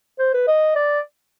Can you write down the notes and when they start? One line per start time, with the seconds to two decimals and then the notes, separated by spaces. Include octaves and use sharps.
0.19 C5
0.34 B4
0.48 D#5
0.76 D5